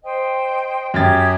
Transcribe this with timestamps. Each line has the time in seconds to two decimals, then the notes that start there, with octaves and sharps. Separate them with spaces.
0.03 C5 D#5 G5
0.94 F#2 G4 G5 D#6 G#6 A6